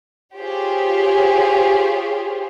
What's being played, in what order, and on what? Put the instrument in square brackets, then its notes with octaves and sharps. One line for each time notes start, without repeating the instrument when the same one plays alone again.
[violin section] F4 G4 G#4 C5 C#5